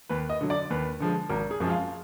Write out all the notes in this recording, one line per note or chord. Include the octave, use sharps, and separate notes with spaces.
D#2 B4
D#5
D3 F#3
D5
D#2 B4
D3 F3 G#3
G#1 A#4
G#4
F#2 F3 G#3
F4